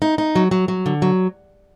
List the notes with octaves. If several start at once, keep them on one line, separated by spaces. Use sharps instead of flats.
D#4
D#4
F#3
F#3
F#3
D3
F#3